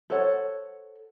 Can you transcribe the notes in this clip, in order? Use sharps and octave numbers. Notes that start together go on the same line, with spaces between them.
A4 C5 C#5 F#5